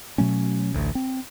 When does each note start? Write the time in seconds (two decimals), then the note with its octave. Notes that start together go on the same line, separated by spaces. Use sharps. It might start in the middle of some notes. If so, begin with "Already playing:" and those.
0.18 B2 F#3 A3 C#4
0.74 A1 D2
0.95 C4